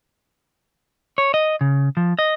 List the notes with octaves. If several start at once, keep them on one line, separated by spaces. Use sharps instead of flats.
C#5
D#5
C#3
F3
D#5